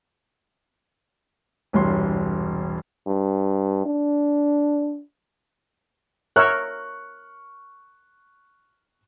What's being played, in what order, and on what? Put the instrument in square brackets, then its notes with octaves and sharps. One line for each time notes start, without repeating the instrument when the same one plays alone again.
[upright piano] E1 C2 G2 C#5 C6
[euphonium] G2
D4
[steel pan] A#4 C#5 E5 [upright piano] C#6 F6 F#6